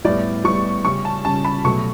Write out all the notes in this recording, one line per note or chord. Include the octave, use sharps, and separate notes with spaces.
A2 G3 B3 D5
A2 G3 B3 C#6
C#3 G3 C#4 C#6
A5
C#3 G3 C#4 A5
B5
B2 F#3 A3 C#6